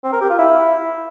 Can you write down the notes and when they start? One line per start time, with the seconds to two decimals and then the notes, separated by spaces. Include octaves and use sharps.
0.04 C4
0.13 A#4
0.21 G4
0.30 F4
0.39 E4